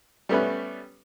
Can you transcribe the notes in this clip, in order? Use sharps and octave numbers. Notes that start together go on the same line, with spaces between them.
G3 A3 B3 C#4 B4